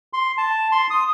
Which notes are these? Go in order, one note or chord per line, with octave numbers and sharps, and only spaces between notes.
C6
A5
C6
D#6